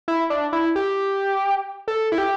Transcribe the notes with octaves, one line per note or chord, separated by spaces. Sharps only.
E4
D4
E4
G4
A4
E4
G4